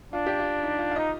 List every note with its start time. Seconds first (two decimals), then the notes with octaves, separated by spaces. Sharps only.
0.13 D4 F4
0.27 G4
0.39 F4
0.63 D#4
0.79 F4
0.91 F5
0.96 D#4 D#5